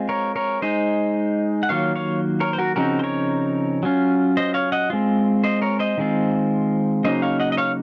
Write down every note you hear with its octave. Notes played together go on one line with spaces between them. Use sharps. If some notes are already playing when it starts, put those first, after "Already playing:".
Already playing: G#3 C4 F4
A#4 C#5
A#4 C#5
G#3 D#4 C5 D#5
F#5
D#3 F#3 A#3 F4 C#5 F5
C#5 F5
A#4 C#5
C5
F#4 A#4
C#3 F3 C4 D#4 F#4 A#4
C5
A#4 C#5
F#3 C#4 F4
C5 D#5
C#5 F5
D#5 F#5
G#3 C4 F4
C5 D#5
A#4 C#5
C5 D#5
D#3 G#3 C4 F4
C#3 F#3 A#3 D#4 C5 D#5
C#5 F5
D#5 F#5
D#5
C#5 F5